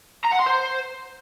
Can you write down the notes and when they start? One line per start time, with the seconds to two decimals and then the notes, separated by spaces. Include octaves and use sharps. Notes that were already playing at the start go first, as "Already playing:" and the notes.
0.24 A#5
0.32 F#5
0.39 C6
0.46 C5